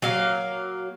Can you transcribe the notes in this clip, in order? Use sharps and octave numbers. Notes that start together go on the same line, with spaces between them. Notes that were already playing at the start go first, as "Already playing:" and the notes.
F#3 A#3 F5